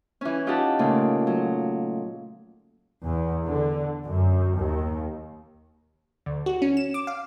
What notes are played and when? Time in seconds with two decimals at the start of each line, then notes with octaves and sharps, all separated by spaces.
0.21 E3 C#4
0.47 D#4 F4 G4 F#5 A5
0.79 A#2 C#3 A3
1.27 F#3
3.04 E2
3.46 D3
4.06 F#2
4.57 D#2
6.26 D2
6.46 F#4
6.62 C#4
6.77 E7
6.94 D6
7.07 F5